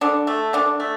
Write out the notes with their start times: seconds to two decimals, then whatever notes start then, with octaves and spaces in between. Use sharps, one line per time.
0.01 D3 D4
0.27 A3
0.53 D3 D4
0.80 A3